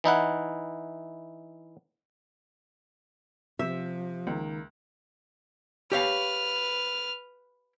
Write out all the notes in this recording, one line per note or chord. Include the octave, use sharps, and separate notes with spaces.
E3 D#4 E4 F#5
C3 F3 E5
C#2 D#3 A#3
G4 B4 C#5 F5 F6